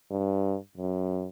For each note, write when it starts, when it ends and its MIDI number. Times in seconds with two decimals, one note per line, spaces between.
0.11 0.57 43
0.77 1.29 42